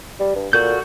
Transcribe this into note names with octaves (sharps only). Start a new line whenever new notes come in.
G3
G2
A#2 F#4 A4 G6